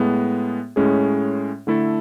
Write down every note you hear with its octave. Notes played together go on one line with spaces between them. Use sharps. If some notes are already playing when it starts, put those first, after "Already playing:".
Already playing: A2 G#3 B3
A2 G#3 C#4 G#4
D3 A3 E4 A4